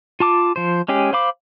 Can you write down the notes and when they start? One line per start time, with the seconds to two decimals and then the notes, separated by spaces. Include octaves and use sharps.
0.20 F4 A5 D6
0.56 F3 C5
0.88 G#3 C#4 G4 G#4
1.13 C5 F5 B5 D6